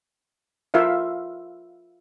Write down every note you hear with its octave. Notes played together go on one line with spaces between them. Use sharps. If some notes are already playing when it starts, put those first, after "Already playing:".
F4 A#4 E5 F5